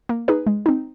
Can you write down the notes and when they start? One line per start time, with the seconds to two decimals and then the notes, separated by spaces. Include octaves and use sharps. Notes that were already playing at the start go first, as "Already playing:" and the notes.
0.09 A#3
0.28 D#4 G#4 B4
0.47 G#3
0.66 C4 D#4